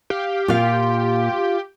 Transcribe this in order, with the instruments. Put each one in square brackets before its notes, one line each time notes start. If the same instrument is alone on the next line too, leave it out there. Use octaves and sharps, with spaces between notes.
[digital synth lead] G4 [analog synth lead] F5
[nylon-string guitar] A#2 F5 [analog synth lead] F4